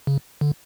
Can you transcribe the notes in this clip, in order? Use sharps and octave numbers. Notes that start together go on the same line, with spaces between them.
C#3
D3